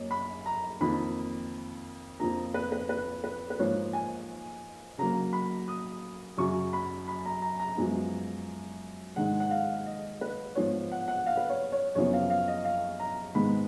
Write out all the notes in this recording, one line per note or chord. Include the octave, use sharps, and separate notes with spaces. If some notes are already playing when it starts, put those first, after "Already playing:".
Already playing: F#2 A#3 C#5 D#5
B5
A#5
F2 D#3 A#3 B5
F2 F3 A#3 A#5
B4
B4
B4
B4
B4
G#2 F3 A#3 C#5
G#5
C#3 F#3 A#3 A#5
B5
D#6
F#2 C#3 F#3 C#6
B5
B5
A#5
A#5
A#5
F#2 F3 G#3 B3
G#2 D#3 G#3 F#5
F#5
F5
D#5
B4
G#2 F3 B3 C#5
F#5
F#5
F5
B4
C#5
C#5
F#2 C#3 F3 B3 C#5
F5
F5
D#5
F5
A#5
G#2 D#3 G#3 B3 B5